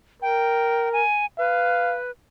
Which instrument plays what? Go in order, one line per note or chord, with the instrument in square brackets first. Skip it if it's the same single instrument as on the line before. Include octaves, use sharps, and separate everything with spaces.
[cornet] A#4 [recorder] G5
[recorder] G#5
[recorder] B4 [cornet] F5